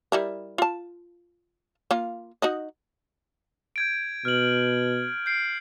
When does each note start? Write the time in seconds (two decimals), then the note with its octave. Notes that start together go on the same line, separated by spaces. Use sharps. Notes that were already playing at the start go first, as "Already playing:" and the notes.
0.12 G3 E4 A#4
0.58 F4 A5
1.91 A#3 F4
2.42 D#4 F#4 D#5
3.76 G6 G#6 D7
4.25 B2 F6 F#7
5.26 G6 C7 D7